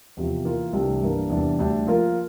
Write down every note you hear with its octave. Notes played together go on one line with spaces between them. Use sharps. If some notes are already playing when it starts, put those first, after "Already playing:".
E2 C3 F3
E3 A#3 F4 A#4
C2 C3 E3 A3 D4
G2 E3 A#3 D4
E2 C3 E3 G3 D4
D2 D3 G3 D4 G4
F3 A#3 F4 A#4